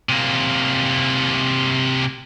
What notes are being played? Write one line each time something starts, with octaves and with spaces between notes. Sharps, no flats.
C3 A#3